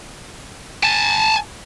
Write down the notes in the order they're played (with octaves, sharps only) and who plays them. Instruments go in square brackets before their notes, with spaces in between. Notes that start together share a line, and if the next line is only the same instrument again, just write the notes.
[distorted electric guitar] G#5 A5